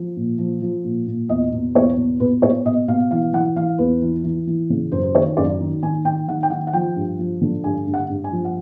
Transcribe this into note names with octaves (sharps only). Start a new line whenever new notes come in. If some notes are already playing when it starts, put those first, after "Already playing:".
Already playing: F3
A#2
F3
F3
A#2
A#2
E2 D#5
B2
E2 C#5
B2
B2 B4
B2 C#5
B2 D#5
B2 F5
E3 F5
E3 F#5
E3 F5
E2 B4
E3
E3
E3
C#3
F#2 C5
C5
D#3 C#5
F#2 D5
D#3
D#3 G#5
D#3 G5
D#3 F#5
G5
D#3 F#5
F#5
F3 G5
G2
F3
D3
G2 G#5
G2
F#5
G2
G#5
F3
F#5